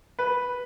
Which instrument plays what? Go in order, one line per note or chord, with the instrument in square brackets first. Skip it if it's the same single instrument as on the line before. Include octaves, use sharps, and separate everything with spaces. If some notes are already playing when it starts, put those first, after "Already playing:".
[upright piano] B4